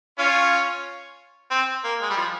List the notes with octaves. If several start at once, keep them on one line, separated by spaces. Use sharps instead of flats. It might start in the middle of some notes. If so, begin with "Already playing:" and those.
C#4 F4
C4
A#3
G#3
G3
F3